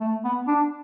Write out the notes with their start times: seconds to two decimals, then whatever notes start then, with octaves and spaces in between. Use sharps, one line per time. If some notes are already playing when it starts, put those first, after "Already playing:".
0.01 A3
0.24 B3
0.47 D4